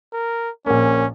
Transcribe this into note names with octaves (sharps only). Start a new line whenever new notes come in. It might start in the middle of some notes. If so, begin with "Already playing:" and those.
A#4
A#1 A#3 C#4